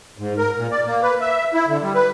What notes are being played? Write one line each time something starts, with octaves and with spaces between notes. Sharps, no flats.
G#2
A#4
A#2
D5
A#3
B4
E5
E4
D3
G3
B4